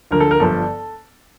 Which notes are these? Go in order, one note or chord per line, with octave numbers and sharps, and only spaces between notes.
D2 D3 F3 A#4
A4
A#4
G1 G2 F3 A4